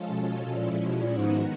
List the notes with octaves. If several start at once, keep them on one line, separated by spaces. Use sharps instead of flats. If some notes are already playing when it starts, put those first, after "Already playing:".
Already playing: F3 G#3 C#4 F4 A4
B2
B2
A#2 F3 G#3 C#4 E4
A#2
B2
A#2
G#2 D#3 G#3 B3 D#4 F#4